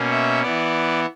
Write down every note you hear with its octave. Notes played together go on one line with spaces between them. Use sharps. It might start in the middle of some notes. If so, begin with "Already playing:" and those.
Already playing: B2 A#3 C#4
E5
E3 B3 D5